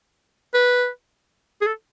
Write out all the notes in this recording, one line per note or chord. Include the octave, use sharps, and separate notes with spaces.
B4
G#4
A4